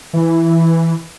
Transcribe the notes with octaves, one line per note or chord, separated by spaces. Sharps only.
E3